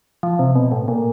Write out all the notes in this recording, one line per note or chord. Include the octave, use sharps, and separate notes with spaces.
F3
C3
B2
A2
A#2